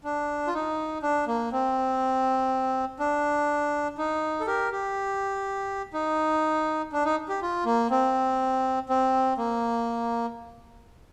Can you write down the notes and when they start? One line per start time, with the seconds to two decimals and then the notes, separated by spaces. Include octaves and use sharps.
0.04 D4
0.47 F4
0.54 D#4
1.02 D4
1.27 A#3
1.52 C4
2.99 D4
3.98 D#4
4.40 A4
4.47 G4 A#4
4.72 G4
5.93 D#4
6.93 D4
7.05 D#4
7.29 G4
7.42 F4
7.65 A#3
7.91 C4
8.89 C4
9.38 A#3